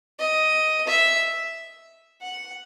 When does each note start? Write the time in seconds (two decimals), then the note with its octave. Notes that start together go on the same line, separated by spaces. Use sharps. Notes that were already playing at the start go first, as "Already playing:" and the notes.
0.19 D#5
0.87 E5
2.22 F#5